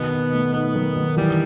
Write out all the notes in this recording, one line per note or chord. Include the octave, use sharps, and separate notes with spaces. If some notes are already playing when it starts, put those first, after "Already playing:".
Already playing: B2 D#3 B3
D#4
A3
B3 D#4
D#3
D#3
E3 G3